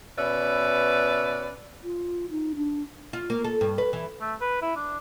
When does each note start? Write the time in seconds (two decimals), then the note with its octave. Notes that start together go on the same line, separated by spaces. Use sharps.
0.18 B2 C#4 B4 D5 E5
1.84 F4
2.31 D#4
2.56 D4
3.13 F4
3.30 A#3
3.44 A4
3.61 G2
3.78 B4
3.93 E3
4.21 A3
4.41 B4
4.62 E4
4.76 D4